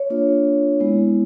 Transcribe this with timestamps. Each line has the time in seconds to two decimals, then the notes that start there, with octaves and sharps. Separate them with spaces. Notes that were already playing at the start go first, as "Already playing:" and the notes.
Already playing: C#5
0.10 A#3 D4 F4
0.80 G#3 B3 E4